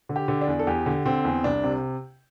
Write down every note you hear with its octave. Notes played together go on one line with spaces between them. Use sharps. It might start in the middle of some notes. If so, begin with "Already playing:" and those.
D3
G4
D3
D4
E2
A4
E2 G4
D3
D3 C4
E2
C2 D4
C3